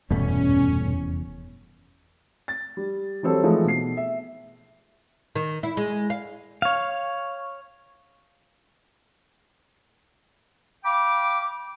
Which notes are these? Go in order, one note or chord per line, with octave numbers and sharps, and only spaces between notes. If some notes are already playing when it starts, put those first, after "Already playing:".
F1 E2 G2 B2 A3 C#4
A6
G3
E3 F#3 G3 C4 A4 C#5
E3 F3 G#3 A3 D#4
B2 C7
E5
D#3
E4
G#3
F5
C#5 F5
F5 G5 B5 D6